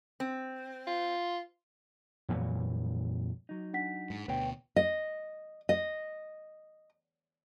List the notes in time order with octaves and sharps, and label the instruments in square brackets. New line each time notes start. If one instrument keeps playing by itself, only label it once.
[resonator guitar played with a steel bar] C4
[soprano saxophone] F4
[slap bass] F2 A#2 E3 F#3
[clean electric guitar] F#3 D#4
[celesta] D4 F#5 B6
[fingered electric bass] G#2
[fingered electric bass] D2 B2 [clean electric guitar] B4 C#5 G5
[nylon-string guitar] D#5
D#5